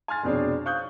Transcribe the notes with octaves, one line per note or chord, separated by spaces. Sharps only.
G#5 C6 F6 A6
F1 B2 C4 D4 G#4 C#5
C5 F5 C#6 D#6 F#6 G6